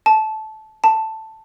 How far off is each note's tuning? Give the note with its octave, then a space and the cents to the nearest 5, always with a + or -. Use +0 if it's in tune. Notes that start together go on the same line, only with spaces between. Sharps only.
A5 -15
A5 +5